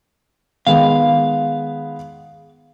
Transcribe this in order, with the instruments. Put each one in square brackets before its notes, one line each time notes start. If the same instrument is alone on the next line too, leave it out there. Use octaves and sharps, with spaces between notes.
[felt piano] D#3 G#3 B3 [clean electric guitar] F5